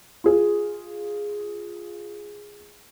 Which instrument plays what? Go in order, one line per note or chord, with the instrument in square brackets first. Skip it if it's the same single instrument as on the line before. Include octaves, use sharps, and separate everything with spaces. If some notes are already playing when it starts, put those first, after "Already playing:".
[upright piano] F4 G#4